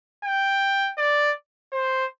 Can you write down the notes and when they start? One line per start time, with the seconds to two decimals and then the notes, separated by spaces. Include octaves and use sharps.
0.24 G5
0.98 D5
1.72 C5